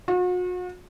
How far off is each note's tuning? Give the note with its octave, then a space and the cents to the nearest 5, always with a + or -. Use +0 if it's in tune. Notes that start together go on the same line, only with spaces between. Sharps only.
F#4 -40